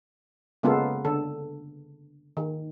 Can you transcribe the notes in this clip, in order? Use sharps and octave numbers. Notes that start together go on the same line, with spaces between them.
C#3 G#3 A#3 B3 F4 A4
D3 A4
D#3